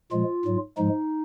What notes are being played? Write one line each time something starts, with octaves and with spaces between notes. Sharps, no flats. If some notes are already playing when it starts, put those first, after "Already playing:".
A#2 F3 G#3 F4
G#2 F#3
G#2 F3 G#3 D#4